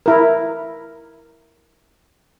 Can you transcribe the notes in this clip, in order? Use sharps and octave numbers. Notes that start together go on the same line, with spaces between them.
E4 A#4